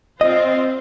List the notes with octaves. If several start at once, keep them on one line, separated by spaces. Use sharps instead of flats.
C4 F4 C5 D#5